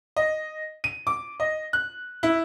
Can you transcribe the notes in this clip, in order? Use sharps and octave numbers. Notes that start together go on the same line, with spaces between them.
D#5
D#7
D6
D#5
F#6
E4